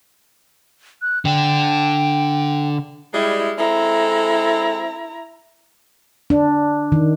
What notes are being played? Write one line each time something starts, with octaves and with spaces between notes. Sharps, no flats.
F#6
D3 D4 G5
G3 G#3 E4
G#3 C4 E4 A4 A#5
D4
D#3